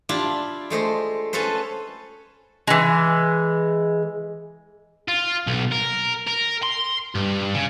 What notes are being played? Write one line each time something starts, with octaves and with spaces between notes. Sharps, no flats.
D4 E4 F4 G4
G#3 A3 C5 D#5
C#4 F4 A4 B4 C5
E3 G#3
F4
B1
A#4
A#4
C6
G2
C#3